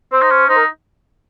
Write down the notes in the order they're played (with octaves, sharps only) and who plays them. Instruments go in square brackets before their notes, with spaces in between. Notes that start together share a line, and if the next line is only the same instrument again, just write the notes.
[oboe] C4 [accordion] C5
[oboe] D#4
C#4
[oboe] D#4 [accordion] C5
[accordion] A#4